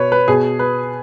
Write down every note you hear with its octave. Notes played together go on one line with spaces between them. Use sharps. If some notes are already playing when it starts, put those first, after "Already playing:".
Already playing: B2 B4 C#5
B4
B2 G#4
B4